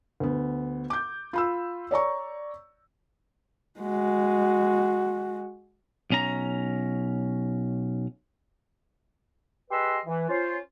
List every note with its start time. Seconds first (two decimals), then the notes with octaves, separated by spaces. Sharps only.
0.20 D2 B3
0.90 D6 G6
1.33 F4 B5 E6
1.91 C#5 D5 A#5 C#6
3.80 G#3 F#4
6.10 B1 C#4 A#5
9.70 G4 G#4 B4 D#5 C6 E6
10.06 E3
10.29 C#4 F4 C5